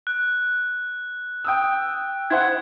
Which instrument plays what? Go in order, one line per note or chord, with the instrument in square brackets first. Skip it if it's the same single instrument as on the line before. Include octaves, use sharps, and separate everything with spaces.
[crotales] F#6
[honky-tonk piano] G5 D#6 E6
[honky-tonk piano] E4 C5 F#5 [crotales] G#6